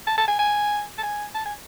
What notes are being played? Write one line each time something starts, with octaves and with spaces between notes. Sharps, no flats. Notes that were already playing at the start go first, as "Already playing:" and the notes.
A5
A5
G#5
G#5
A5
G#5
A5
G#5